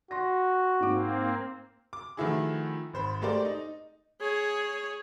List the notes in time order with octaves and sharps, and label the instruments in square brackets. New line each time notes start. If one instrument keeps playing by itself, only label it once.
[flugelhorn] F#4 [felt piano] C6 A#6
[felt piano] G#2 D6 [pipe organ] A#3 C4
[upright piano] D6
D#3 F3 A3 E4 F#4 G#4
G#1 C5 B5
G#3 A3 G4 A#4 C5 D5
D#4
[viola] G#4 C#5